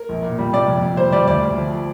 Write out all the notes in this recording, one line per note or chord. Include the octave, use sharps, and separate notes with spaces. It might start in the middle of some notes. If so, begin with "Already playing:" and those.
Already playing: A#4
A#1
A#2
G3
C3 D5
F2
F2
G3 C5
G3 D5
D2 D5
D2
F3